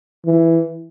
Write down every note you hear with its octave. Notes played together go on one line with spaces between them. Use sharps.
E3